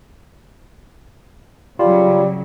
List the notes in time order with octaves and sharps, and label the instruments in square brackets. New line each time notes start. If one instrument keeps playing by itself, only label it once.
[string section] C#3 F#3 [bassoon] G3 [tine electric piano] F4